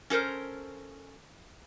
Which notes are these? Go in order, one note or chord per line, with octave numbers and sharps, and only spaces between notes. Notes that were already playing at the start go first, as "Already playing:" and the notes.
C#4 A4 A#4 C5